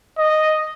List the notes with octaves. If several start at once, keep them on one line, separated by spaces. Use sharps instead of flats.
D#5